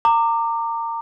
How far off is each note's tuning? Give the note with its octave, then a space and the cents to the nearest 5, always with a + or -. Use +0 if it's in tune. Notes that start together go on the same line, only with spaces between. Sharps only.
A#5 -25 D6 +15